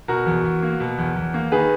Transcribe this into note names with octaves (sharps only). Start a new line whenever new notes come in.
B2 F#4 A#4
E2
E2
A#3
B2
E2
E2
A#3
D#3 G#4 B4